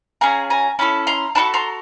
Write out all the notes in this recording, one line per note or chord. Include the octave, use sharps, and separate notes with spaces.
C#4 F4 G#4 G#5 A#5
G#5 A#5
C#4 E4 A4 A5 B5
A#5 C6
D4 F#4 A4 A5 B5
A#5 C6